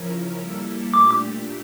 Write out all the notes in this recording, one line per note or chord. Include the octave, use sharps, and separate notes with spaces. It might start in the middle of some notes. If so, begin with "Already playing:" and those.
Already playing: C#3 F3 C#4 E4 A#4
G3 A#3 E4 A4
A#2 A3 D4 G4 D6